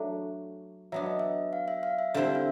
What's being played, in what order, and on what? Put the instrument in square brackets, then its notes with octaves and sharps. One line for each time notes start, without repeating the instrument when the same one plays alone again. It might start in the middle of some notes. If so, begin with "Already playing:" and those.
Already playing: [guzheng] F#3 A3 D4
[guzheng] F#3 B3 D4 [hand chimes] E5
[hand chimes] D#5
E5
F5
E5
F5
E5
[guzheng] D3 G3 C4 E4
[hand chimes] F5
E5